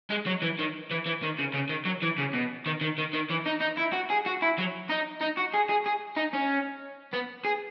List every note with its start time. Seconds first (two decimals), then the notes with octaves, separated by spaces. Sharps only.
0.10 G#3
0.26 F#3
0.42 E3
0.59 D#3
0.91 E3
1.06 E3
1.23 D#3
1.39 C#3
1.54 C#3
1.70 D#3
1.86 F#3
2.03 E3
2.18 C#3
2.34 B2
2.66 D#3
2.81 D#3
2.98 D#3
3.14 D#3
3.30 E3
3.46 D#4
3.61 D#4
3.78 E4
3.93 F#4
4.10 G#4
4.26 F#4
4.42 E4
4.58 F#3
4.89 D#4
5.21 D#4
5.37 F#4
5.54 G#4
5.69 G#4
5.86 G#4
6.16 D#4
6.33 C#4
7.13 B3
7.45 G#4